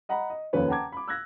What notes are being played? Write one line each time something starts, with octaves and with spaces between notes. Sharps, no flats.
D#5 F#5 A#5 B5
D#5
F1 D#2 F3 C#4 B4 C#5
F#5 G5 A5 A#5 D6 G#6
B5 D6
E6 F#6 G#6 A#6